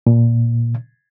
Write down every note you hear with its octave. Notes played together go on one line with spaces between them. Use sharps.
A#2